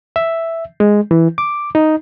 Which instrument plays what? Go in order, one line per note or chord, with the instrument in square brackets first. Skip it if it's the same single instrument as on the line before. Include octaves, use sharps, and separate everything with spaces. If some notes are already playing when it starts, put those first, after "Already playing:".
[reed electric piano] E5
G#3
E3
D6
D#4